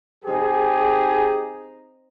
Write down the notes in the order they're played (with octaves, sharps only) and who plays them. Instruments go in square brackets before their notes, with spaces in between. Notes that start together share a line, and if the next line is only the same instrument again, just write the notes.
[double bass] C4 D#4 [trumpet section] G4 G#4